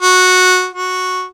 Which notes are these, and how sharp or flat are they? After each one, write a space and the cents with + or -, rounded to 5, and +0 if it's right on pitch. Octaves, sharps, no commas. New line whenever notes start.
F#4 -10
F#4 -5